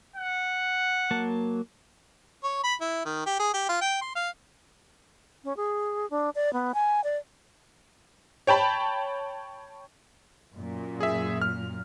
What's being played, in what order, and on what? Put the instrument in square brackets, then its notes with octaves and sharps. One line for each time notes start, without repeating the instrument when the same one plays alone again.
[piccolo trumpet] F#5
[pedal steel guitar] F#3 A#3 A5
[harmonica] C#5
B5
E4
D#3
G4
G#4
G4
F4
G5
C6
F5
[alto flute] C#4
G#4
D4
D5
B3
G#5
D5
[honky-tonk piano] C#5 G5 A5 B5
[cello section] F#2 A#2
[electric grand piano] G#4 E5
F6